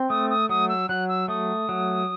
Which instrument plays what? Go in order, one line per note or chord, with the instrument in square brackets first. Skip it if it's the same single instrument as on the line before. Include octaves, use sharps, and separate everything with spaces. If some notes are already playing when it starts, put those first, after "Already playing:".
Already playing: [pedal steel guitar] C4
[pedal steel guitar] A3 [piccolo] D#6
[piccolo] D#6
[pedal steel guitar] F#3 [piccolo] D#6
[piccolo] E6
[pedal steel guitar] F#3 [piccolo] F#6
[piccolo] E6
[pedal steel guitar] A3 [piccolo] D#6
[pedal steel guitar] F#3